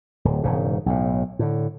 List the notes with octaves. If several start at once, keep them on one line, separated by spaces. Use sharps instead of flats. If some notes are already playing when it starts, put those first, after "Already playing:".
D1
E1 G#2 C#3
B1 A2
A2 D3